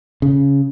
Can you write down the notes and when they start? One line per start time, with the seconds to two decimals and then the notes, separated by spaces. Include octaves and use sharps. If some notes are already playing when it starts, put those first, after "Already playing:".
0.22 C#3